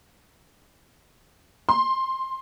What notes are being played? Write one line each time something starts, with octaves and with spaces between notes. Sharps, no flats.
C6